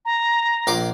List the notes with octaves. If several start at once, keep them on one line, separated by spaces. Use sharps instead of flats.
A#5
A#1 C6 D6